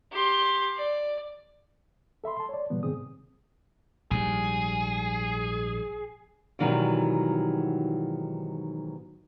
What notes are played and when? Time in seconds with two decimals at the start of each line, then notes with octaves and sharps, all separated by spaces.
0.12 G4 C6
0.76 D5
2.24 A4 E5 B5 C6
2.37 A5 C6
2.49 C#5 D5
2.70 A#2 C#3 E3 G3 B3
2.83 G#2 C3 D#3 C4 G#4 D#6
4.11 A#1 G#2 G3 G#4
6.59 G#2 B2 D#3 E3 F#3 G3